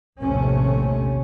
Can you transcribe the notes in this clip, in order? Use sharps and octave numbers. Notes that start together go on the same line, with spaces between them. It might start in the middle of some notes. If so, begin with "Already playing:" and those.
A#1 D#2 A2 C3 A3 C#4